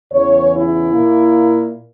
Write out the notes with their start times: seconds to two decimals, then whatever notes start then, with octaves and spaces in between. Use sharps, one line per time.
0.12 E2 C#3 E3 C#5
0.53 E4
0.93 A#2 A#3